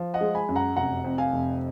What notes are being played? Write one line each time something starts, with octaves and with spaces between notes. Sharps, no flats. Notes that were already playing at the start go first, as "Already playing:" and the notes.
Already playing: F3
D#5 F#5
G#3
G#5 B5
F#2
F#5 A#5
F1 F#5 A#5
F2
F5 G#5
F1